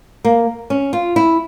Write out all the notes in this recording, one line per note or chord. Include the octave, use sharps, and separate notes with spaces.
A#3
C#4
F4
E4